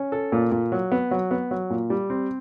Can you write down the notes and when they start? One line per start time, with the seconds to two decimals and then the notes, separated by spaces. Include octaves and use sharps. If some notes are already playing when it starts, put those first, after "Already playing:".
Already playing: C#4
0.12 A4
0.32 A#2
0.52 A#2
0.72 F#3
0.92 B3
1.11 F#3
1.31 B3
1.51 F#3
1.70 A#2
1.90 G3
2.10 C4